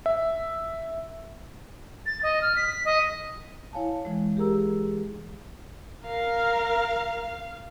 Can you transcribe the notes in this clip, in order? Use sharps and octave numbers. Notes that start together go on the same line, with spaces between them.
E5
A6
D#5
F6
B6
D#5
E4 C#5 F5 G#5 A5
E3 G#3
G4 G#4 A#4 A#5 E6
A#4 F5